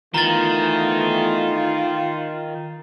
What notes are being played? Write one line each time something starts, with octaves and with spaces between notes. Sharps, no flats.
D#3 E3 A3 B3 F4 A#5 A6